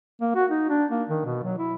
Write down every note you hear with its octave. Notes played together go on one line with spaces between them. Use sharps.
A#3
F#4
D#4
D4
A#3
D#3
B2
F#3
E4